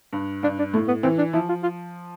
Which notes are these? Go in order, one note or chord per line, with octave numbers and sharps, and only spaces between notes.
G2
G2 D4
D4
A2 A3
B3
E3 C4
D4
F3 E4
F4
F4